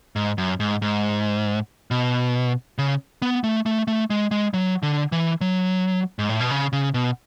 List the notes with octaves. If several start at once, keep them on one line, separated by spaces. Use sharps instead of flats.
G#2
F#2
G#2
G#2
B2
C#3
B3
A3
A3
A3
G#3
G#3
F#3
D3
E3
F#3
G#2
A2
B2
C#3
C#3
B2